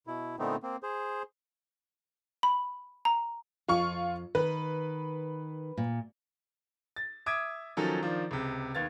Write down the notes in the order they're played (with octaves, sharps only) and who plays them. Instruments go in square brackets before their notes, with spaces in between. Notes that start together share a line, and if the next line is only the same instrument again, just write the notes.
[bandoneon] B2 E4
A#2 D3 A3 B3 C4 D#4
A#3 C4
G#4 C5
[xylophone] B5
A#5
[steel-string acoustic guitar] F2 [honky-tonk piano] F4 C#6
[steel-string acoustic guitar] D#3 [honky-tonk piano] B4
[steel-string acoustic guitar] A#2
[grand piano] A6
E5 D6 D#6 G#6 D7
D#3 F3 F#3 C#4 A4
D#3 F3 D4 F4
C#2 C3
D#2 B3 F5 G#6 A6